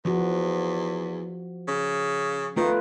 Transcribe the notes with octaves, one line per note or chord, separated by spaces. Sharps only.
E2 F3 F#4
C#3
D#3 A3 F4 B4